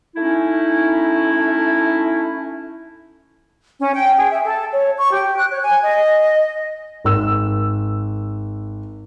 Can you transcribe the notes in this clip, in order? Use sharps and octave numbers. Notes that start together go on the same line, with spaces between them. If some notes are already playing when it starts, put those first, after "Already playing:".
A3 C#4 D#4 E4
C#4
G5
G#4
E5
A4
C#5
C#6
G4
F#6
C#5
G#5
D#5
G#1 E6